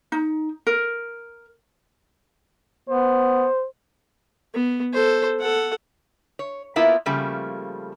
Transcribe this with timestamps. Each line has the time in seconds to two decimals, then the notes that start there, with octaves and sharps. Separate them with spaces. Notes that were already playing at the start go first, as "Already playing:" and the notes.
0.12 D#4
0.67 A#4
2.89 B3 C5
4.54 B3
4.93 A4 C5
5.40 A4 F#5
6.39 C#5
6.76 A#3 B3 E4 F4 A#4
7.06 C#3 F3 G3 A3 A#3